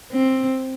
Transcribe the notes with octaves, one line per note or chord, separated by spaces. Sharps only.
C4